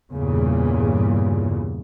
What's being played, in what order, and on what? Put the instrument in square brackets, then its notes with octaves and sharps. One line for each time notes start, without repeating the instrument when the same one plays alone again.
[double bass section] E2 G2 A#2 C#3